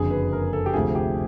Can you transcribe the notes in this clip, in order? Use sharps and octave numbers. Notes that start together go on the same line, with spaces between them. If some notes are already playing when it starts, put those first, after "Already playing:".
Already playing: F#1 F2 D3 G#4
B4
A#4
A4
G4
D2 C3 F3 A3 G#4
G4